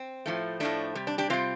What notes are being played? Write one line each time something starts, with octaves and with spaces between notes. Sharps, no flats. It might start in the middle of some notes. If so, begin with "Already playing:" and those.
Already playing: C4
A2 F3 A3
A2 F3 A3 D4
C3 G3
D4
D4 G4
C3 G3 C4 F4